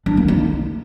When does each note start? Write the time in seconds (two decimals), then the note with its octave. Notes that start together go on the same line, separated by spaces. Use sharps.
0.06 D4
0.17 A#3
0.28 D#4